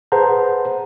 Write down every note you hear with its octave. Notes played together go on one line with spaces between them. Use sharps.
G#4 B4 C5 F#5 A5 A#5